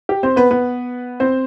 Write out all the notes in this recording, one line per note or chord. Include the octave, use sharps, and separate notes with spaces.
G4
C4 C5
B3 B4
B3 B4
C4 C5